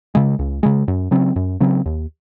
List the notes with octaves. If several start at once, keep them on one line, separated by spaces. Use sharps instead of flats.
C#3 G#3
C#2
C#3 G#3
F#2
C#3 F#3 C4
F#2
C#3 F#3 C4
D#2